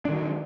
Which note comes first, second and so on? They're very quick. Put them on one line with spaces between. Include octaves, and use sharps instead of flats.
D4 D#3 F#3